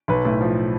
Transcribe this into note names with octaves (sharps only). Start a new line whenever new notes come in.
B1 B4
A2
F3